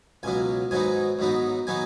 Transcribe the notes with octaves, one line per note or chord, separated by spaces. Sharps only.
C#2 B2 F#3 G#5
G#2 F#3 B3 D#4 G#5
G#2 F#3 B3 D#4
F#3 B3 D#4 G#5